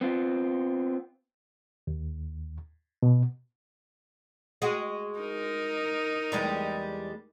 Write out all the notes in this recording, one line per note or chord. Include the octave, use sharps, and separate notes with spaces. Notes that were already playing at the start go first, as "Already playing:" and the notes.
B3 C4 F4
D#2
B2
G#3 F#4
D#4 A#4
E2 G3 G#3